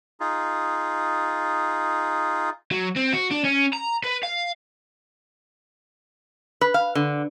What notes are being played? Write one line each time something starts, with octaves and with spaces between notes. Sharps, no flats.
D#4 F4 G#4
F#3
C4
F#4
D4
C#4
A#5
B4
F5
B4
F5
D3